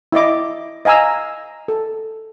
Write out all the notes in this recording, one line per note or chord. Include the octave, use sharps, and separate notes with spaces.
E4 D5 D#5 D6
D#5 F5 G#5 A#5 E6
A4